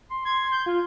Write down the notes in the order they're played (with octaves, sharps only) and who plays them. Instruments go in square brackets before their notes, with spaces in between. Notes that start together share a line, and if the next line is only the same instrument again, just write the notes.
[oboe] C6
[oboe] C6 [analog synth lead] G#6
[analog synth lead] G6
F4